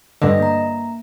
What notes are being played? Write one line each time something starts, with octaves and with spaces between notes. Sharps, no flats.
G2 D3 D#5 A#6
A#3 A#5